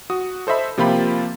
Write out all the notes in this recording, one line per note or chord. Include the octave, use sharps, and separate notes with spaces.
F#4 D#6
A4 C5 D#5 E5 B5
C3 F3 A#3 F4 G4 B5